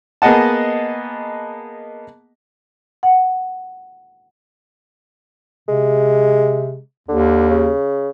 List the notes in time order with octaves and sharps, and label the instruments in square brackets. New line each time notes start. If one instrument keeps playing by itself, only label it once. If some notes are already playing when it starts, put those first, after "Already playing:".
[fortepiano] A#3 B3 G#4 D#5 F#5 A5
[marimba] F#5
[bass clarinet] C3 [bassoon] G#3
[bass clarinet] D#2 [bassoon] D3
[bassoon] C#3